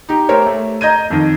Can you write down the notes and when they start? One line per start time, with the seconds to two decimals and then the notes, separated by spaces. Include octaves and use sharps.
0.09 D#4 G4
0.29 A3 G4 A#4 C5 C#5
0.46 A3
0.81 D#5 A#5 G6 G#6 D#7
1.10 F2 D#3